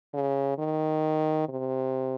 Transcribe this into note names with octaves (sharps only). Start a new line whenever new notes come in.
C#3
D#3
C3